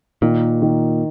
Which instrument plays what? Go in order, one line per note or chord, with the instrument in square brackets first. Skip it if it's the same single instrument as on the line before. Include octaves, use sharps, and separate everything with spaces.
[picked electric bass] A#2 [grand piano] D#3
[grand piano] D#3